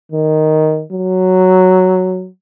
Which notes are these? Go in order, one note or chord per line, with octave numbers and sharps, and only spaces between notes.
D#3
F#3